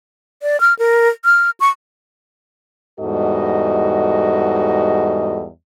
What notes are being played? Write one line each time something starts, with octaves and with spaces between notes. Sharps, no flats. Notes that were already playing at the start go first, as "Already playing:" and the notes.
D5
F6
A#4
F6
C#6
E2 G#2 G3 F#4 A4 D#5